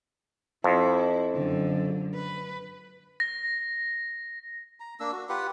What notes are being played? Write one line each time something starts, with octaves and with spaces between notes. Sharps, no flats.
F2 E4
F#2 D3
B4
A#6
A#5
A#3 D4 E6
F#4
F4 G4 B4 F#5